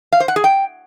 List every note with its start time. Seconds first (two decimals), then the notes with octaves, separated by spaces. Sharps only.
0.13 F5
0.20 C5
0.28 F#5
0.36 G#4
0.44 G5